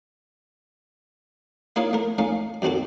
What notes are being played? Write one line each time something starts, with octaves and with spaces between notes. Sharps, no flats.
A#3 D#4 E4 C#5 D#5 F5
A3 A#4
A3 C#4 D#4 F5
F#2 D#3 C4 F#4 A4